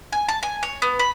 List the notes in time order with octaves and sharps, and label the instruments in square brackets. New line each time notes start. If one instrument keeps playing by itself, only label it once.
[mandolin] G#5
A5
G#5
C#5
B3
B5